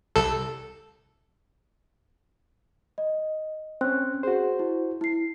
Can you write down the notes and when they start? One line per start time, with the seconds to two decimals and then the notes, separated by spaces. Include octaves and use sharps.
0.16 C2 A4
2.98 D#5
3.81 C4 C#4 F#6
4.23 F#4 G#4 C5
4.59 E4
5.01 E4 C7